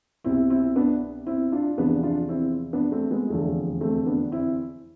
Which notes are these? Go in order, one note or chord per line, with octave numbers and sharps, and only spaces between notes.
C2 B2 C4 E4
C4 E4
B3 D4
C4 E4
D4 F4
E2 C3 F3 B3 D4
D4 F4
C4 E4
B3 D4
A3 C4
G#3 B3
F1 E2 D3 F3 A3
A3 C4
B3 D4
C4 E4